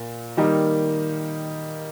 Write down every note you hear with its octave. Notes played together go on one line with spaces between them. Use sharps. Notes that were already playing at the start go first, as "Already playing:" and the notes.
Already playing: A#2
D#3 G3 A#3 D#4